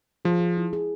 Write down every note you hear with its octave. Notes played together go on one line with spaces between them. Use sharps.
F3 G#4
G#4
E4
G#4